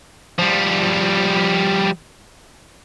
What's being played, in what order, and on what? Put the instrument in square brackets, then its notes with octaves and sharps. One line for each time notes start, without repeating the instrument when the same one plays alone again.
[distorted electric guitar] F3 G3